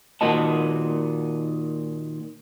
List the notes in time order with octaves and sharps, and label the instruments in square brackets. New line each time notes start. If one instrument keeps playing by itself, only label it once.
[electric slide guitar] A#2 D#3 F#4 D#5 A5